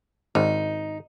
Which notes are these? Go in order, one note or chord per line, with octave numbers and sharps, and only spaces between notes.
G#1 D#4